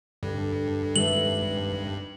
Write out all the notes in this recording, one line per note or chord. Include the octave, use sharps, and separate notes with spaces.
G2 D3 A4
G#1 A4 B4 E5 F#7